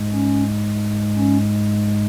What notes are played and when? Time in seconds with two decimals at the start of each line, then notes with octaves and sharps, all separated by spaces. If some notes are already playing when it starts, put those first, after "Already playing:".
Already playing: G#2 G#3
0.12 C#4
1.16 C#4